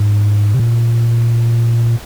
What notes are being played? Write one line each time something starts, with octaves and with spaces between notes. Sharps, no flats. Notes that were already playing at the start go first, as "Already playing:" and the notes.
Already playing: G#2
C3
A#2